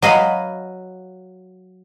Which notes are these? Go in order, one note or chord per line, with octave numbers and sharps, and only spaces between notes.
F#3 D#5 F5 B5